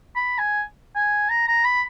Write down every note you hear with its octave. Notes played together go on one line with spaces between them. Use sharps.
B5
G#5
G#5
A#5
A#5
B5